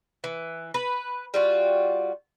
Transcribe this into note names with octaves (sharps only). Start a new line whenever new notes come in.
E3
B4
G3 F4 F#4